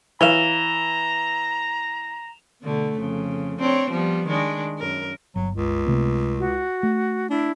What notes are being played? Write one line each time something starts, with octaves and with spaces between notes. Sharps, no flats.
E3 C#5 F5 A#5 E7 F7 G7
B2 D3 A3
F2 C#3
C4 D4 C#5
F3 G3 B3
D#3 G#3 D4
F#2 A#4
G1 F#3
C#2
C3 A3 B3
F#4
A3
D4 E4